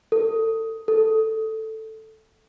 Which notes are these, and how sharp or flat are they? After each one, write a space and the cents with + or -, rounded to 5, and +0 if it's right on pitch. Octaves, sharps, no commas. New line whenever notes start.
A4 +30
A4 +5